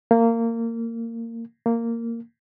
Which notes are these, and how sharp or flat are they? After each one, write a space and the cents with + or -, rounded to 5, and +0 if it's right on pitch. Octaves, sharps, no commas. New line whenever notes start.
A#3 -20
A#3 -10